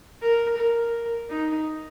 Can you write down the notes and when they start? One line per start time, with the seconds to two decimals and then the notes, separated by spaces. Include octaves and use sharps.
0.22 A#4
0.57 A#4
1.29 D#4